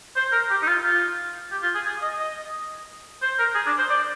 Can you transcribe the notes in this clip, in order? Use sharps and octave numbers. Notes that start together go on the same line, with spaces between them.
C5
A#4
G4
D#4
F4
F4
G4
F4
G#4
G#4
D#5
D#5
C5
A#4
G#4
D4
C5
D5